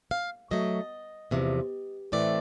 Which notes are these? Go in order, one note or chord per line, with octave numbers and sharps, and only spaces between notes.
F5
B2 F#3 A3 D#5
E2 C3 F3
A2 E3 A3 C4 D5